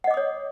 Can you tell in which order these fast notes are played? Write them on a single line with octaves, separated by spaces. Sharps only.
F#5 D#5 D6 D#6 C#5